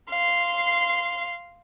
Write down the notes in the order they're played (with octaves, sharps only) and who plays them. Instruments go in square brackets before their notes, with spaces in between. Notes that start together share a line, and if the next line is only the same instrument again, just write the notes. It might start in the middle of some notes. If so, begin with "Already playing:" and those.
[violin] F5 C6